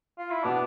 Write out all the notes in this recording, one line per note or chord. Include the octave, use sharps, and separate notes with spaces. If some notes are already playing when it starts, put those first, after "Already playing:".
F4
E4
B2 B3 D4 E4